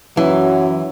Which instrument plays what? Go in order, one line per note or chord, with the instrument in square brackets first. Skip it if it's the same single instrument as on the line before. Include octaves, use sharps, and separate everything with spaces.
[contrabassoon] F#2 [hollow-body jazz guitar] E3 [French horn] F#3